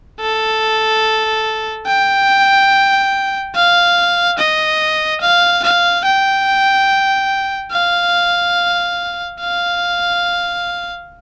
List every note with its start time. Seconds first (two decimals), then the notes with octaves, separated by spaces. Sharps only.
0.20 A4
1.87 G5
3.55 F5
4.39 D#5
5.21 F5
5.64 F5
6.05 G5
7.72 F5
9.40 F5